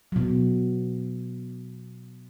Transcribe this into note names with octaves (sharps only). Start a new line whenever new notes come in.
B2 F#3